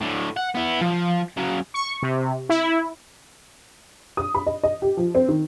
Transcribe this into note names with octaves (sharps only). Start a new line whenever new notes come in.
A2 D3
F#5
B3 E4
F3
C#3 F#3
C#6
C3
E4
D#6
B5
D#5
D#5
G4
F3
C4
D#3